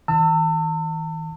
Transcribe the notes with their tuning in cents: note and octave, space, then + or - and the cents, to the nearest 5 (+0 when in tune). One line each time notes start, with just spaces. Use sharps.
D#3 +45 A5 +40 E6 +0